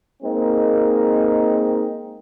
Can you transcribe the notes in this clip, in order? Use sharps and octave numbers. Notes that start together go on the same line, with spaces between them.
G#3 A#3 C4 D#4